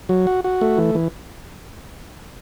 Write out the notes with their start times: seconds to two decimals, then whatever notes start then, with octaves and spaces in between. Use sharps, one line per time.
0.09 F#3
0.27 F#4
0.44 F#4
0.61 A3
0.78 E3
0.95 E3